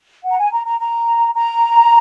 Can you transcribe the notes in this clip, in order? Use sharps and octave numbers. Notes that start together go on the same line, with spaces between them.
F#5
A#5
G#5
A#5
A#5
A#5
A#5